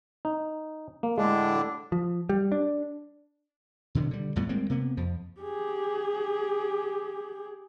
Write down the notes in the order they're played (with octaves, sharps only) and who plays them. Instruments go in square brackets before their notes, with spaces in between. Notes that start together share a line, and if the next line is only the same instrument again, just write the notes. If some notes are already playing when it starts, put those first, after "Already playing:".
[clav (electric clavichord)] D#4
A#3
[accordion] A2 D3 D4 [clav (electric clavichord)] G#3
[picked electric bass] F3
G3
D4
[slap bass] B2 D3 D#3 F#3
D3 G3
D#2 A2 G3 B3
G3 G#3 A#3 C4
C3 A#3 B3
F2 F3
[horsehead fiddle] G4 G#4